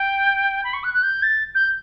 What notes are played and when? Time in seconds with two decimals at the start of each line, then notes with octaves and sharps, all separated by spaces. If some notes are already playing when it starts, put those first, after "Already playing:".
Already playing: G5
0.64 B5
0.74 C#6
0.84 F#6
0.94 F#6
1.03 G6
1.23 A6
1.55 G6